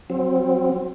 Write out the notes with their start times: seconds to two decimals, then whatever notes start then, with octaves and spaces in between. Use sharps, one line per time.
0.10 F#3 C4